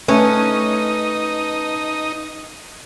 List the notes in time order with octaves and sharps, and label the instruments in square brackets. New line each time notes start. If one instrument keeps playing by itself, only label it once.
[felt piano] A3 [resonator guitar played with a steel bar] C#4 [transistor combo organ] D#4 [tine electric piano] B4